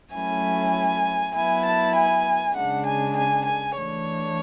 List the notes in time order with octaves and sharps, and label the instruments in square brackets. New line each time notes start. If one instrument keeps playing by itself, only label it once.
[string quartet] F#3 A3 C#4 E4 G#5
F#3 B3 E4 G#5
A5
G#5
C#3 G#3 D4 F#5
G#5
G#5
G#5
E3 A3 D4 C#5